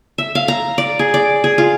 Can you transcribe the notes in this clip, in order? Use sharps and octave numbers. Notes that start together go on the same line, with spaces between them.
E5
F5
A#5
D5
G#4
D5
G#4
F4